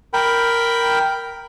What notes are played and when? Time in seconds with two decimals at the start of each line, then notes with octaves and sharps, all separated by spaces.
0.14 A#4 G5 B5